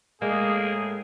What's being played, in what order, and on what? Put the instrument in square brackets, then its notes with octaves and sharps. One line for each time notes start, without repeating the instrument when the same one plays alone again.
[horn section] A2 G#4 [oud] G#3 [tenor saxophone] A#3